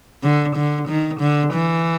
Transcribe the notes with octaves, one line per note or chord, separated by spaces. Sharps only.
D3
D3
D#3
D3
E3